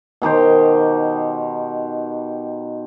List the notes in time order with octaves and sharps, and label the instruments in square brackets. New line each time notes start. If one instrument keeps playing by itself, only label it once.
[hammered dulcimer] B2 D#3 G4 C5